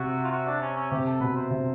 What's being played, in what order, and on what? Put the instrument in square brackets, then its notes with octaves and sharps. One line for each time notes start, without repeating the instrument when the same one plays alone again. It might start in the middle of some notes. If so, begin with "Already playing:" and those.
Already playing: [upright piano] C3 [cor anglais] F#4
[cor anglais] F4
F#4
D4
C#4
C#4
[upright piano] C3 [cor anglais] G4
[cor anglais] A4
[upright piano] B2 [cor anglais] B4
[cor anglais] C5
[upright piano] C3